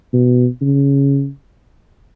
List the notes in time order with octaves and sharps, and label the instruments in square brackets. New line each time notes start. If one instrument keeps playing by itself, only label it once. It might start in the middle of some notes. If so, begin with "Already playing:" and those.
[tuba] B2
C#3